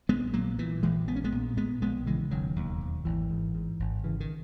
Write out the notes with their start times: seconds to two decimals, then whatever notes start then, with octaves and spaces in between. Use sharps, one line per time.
0.09 A#1 G#3 B3
0.33 A#2 F#3 A#3
0.59 A#2 E3
0.83 A#1 E3 G#3
1.08 A#1 B3
1.16 C#4
1.24 G#3 B3
1.32 A#2
1.57 A#2 G#3 B3
1.82 A#1 G#3 B3
2.07 C#3 E3 G#3
2.31 E1 D#3 F#3
2.56 D#2
2.81 E1
3.05 G#1 E3
3.30 G#2
3.55 G#2
3.80 G#1
4.04 C#3 E3
4.20 D#3